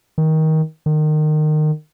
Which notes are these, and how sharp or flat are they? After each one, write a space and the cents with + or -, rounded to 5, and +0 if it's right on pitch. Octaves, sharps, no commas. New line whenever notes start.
D#3 +20
D#3 -25